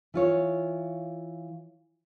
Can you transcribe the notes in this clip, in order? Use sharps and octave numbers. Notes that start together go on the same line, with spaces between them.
E3 F4 C#5